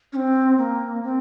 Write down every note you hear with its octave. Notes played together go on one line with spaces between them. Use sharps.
C#4
C4
A#3
C4